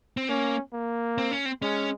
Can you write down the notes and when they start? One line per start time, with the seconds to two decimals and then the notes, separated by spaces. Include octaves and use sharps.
0.17 C4
0.29 A#3 C#4
0.73 A#3
1.18 C4
1.31 C#4
1.46 C4
1.62 G#3 C#4